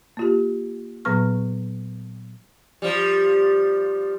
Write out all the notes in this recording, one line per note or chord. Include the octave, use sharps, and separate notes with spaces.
A#3 F4 G4
A#2 F#3 B3 B4 C#6 F6
F3 G3